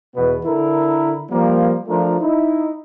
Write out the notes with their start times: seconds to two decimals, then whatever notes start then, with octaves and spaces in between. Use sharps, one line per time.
0.15 E2 B2 B3
0.45 D3 E4 A4 A#4
1.30 F3 G3 A#3
1.87 F3 A3 D4 F4 A#4
2.20 D#4 E4